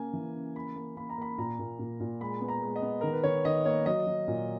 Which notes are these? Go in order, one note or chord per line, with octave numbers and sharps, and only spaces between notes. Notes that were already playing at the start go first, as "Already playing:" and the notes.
Already playing: C#3 A#3 G#5
E3
C#3
A#3 B5
A#3
A#3 B5
A#5
A#3 B5
A#2 A#5
A#2
A#2
A#2
G#3 B5
B3
A#5
G#3
D#5
B3
D#3 A#4
B4
D#3 C#5
D#3 D#5
A#3 C#5
F#3 D#5
F#3
A#2